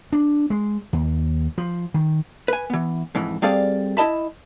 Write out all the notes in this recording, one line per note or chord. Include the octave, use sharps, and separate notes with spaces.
D4
G#3
D#2
F3
D#3
B4 G#5
E3 B3
F2 G#2 E3
G3 C4 G#4 A4 D5 F5
E4 D#5 A5 B5